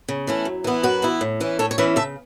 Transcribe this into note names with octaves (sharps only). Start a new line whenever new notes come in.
C#3
E3 A3 C#4 E4
F#2
E3 B3 E4
F#2 F#4 B4
E3 B3 E4
A2
E3 C#4 E4
A2 A4 C#5
C#5
E3 C#4 E4 B4 E5
C#3 E5 A5